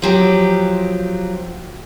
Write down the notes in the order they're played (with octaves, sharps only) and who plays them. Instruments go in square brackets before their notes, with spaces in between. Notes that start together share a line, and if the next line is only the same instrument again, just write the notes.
[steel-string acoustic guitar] F3 F#3 G4